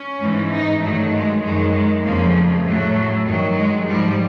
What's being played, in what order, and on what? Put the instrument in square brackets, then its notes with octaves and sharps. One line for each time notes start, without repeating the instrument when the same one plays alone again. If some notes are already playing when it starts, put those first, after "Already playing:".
Already playing: [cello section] C#4
G#2 E3
D#4
G2 D#3 F#3 A3
G#3
F#2 D#3 F#3 G#3
G#3
F2 C#3 F3 A#3
A3
A2 F#3
G2 D#3 F#3
G#3
G#2 F3 G3